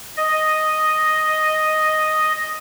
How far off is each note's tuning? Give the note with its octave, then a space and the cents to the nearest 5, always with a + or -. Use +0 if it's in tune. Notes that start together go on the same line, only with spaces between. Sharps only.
D#5 +0